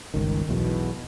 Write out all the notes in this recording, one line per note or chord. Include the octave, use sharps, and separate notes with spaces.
G1 C#2 D#3
B1 E2 B2